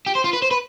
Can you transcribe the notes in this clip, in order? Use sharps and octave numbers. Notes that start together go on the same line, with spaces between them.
G4
C5
F4
B4
C5
B4